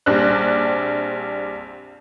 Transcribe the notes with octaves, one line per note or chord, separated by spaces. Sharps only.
A#1 G3 C4 D4 F#6